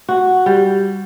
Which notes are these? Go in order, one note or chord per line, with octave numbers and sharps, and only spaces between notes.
F#4
G3